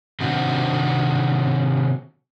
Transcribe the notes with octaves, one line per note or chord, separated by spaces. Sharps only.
C3 D#3 C4 D4 F#4